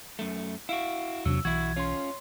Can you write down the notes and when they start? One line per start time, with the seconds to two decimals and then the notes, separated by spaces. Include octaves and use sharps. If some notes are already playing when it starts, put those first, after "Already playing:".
0.19 F#2 A3
0.69 E4 F#4 F5 D7
1.25 E2 C3 F#3 D4 E6
1.45 B1 E3 E4 F#4 G#6
1.77 C#4 F4 C#5 C6